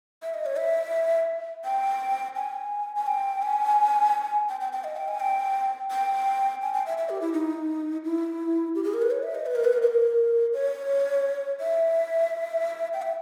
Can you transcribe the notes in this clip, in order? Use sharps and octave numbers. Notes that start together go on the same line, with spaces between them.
E5
D#5
C#5
E5
G5
G#5
G#5
G5
G#5
G5
G5
G5
D#5
G5
G#5
G5
G5
G#5
G5
E5
E5
G4
E4
D#4
E4
G4
G#4
A#4
B4
C#5
E5
D#5
B4
A#4
B4
A#4
B4
A#4
C#5
E5
G5
E5